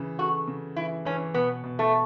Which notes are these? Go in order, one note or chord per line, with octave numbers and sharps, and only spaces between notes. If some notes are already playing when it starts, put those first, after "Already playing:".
Already playing: C#3 E3
F#4 A4
C#3
E3 E4
E3 C#4
B2 B3
B2
A3